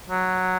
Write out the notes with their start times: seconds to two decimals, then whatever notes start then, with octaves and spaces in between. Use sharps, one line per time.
0.09 F#3